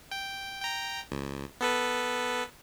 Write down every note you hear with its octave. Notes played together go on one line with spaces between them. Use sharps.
G5
G5 A#5
C#2
B3 A4 B4